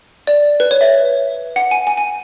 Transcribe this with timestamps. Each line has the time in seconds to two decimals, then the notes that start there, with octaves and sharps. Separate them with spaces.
0.27 D5
0.60 B4
0.71 C#5
0.81 E5
1.56 F#5
1.71 G#5
1.87 G#5
1.97 G#5